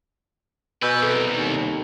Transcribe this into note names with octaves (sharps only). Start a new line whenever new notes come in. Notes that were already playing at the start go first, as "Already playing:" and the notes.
B2 B4 G#5 E6 G6
C2 A4
D#2